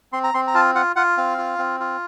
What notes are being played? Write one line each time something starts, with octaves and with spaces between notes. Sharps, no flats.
C4 C6
A#5
C4 C6
A#5
F4 A5
F4 F#5
F4 F#5
C4 F5
F4
C4
F4